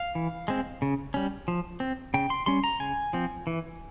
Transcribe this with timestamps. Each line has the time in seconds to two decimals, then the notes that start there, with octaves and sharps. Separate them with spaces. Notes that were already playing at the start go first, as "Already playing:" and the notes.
Already playing: F5
0.15 E3
0.48 G#3 C4
0.82 C#3
1.14 G3 C#4
1.48 F3
1.80 C4
2.14 C#3 G5
2.30 C6
2.46 G3 C#4 C6
2.64 A#5
2.80 C#3 G#5
3.13 F3 C4
3.47 E3